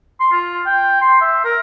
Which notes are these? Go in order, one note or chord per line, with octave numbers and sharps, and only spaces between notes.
C6
F4
G5
C6
E5
A#4